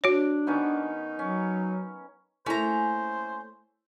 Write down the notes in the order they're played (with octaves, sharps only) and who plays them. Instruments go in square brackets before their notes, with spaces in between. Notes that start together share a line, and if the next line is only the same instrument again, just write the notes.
[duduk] D4 [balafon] F#4 C#5
[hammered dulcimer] D#3 B3 C#4 [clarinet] D#4
[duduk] F#3 [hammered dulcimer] C#4
[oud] A3 A#3 [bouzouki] C#4 A#5 [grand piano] E4 A4 [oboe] C5